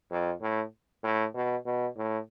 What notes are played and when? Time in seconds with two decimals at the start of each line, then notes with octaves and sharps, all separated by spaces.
0.10 F2
0.41 A2
1.04 A2
1.34 B2
1.65 B2
1.96 A2